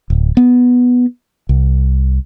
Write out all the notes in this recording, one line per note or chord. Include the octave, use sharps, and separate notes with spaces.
D1
B3
C2